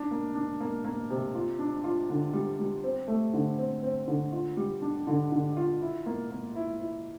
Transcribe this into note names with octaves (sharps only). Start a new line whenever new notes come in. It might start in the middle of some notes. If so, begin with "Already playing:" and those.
Already playing: D4
A#3
D4
A#3
A#3
C3
F4
D4
F4
D3
G3
G3
C4
A3
D3
C4
C4
D3
F4
G3
D4
D3
D3
F4
E4
A#3
A#3
E4
E4